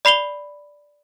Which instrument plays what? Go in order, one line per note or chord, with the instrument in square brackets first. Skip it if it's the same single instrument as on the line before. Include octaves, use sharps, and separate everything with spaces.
[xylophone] D5 B5 C7 F7 G7